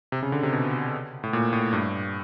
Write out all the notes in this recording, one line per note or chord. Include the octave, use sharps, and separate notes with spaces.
C3
C#3
D3
C3
B2
A2
A#2
A2
G2